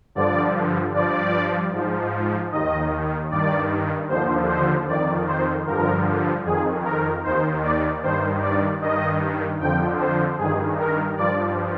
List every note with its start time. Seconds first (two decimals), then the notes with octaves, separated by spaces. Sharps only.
0.15 G2 D3 F3 D5
0.94 G2 F3 D5
1.72 G#2 F3
2.52 D#2 D#3 D#5
3.31 G2 D#3 D5
4.09 D#2 D3 F3 C5
4.49 C5
4.88 F2 D#3 D5
5.27 C5
5.66 G2 D3 F3 A#4
6.45 F2 D#3 G#4
6.85 A#4
7.24 D#2 D#3 C5
7.63 D5
8.03 G2 D#3 C5
8.42 D5
8.82 G2 D#3 D#5
9.60 F2 D3 F3 G5
10.00 C5
10.38 G2 D#3 G#4
10.78 A#4
11.17 G2 F3 D5